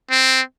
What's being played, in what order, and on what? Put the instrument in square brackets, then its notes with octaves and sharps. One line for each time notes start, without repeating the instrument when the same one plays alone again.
[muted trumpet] C4